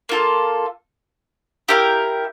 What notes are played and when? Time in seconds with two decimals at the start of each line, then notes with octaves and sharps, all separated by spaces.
0.09 A#3 F4 A4
1.69 E4 G4 A#4 F5